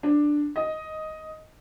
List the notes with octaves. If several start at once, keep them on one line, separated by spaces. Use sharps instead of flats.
D4
D#5